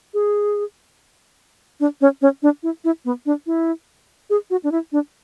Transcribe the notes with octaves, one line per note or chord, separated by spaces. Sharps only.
G#4
D4
C#4
C#4
D4
E4
E4
B3
D4
E4
G#4
F#4
D4
E4
D4